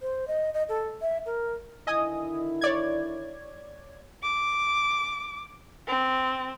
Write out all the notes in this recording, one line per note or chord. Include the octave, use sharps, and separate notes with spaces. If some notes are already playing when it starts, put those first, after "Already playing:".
C5
D#5
D#5
A4
E5
A#4
D3 D#3 E4 D#5 G#5 D#6
C#5 D5 G#6
D6
C4